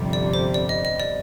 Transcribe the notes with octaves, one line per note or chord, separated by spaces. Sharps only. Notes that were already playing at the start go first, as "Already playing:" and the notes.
Already playing: G1 F2 C3 G3
D5
C5
D5
D#5
D#5
D5